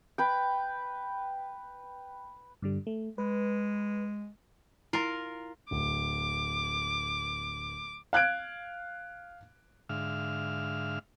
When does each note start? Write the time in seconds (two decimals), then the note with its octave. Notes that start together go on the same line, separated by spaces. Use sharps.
0.18 B4 G5
2.62 G2 D3 G3
2.87 A3
3.18 G#3 B4
4.93 E4 F4 A#4 A#5
5.71 D1 D6
8.13 F5 F#6 G#6 D7
9.89 G#2 D3 E5 F5 F6